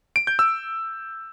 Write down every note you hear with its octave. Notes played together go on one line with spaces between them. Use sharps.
D7
G6
E6